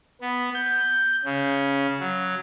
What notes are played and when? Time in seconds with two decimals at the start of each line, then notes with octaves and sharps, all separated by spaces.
0.21 B3
0.54 G6
1.25 C#3
2.00 F#3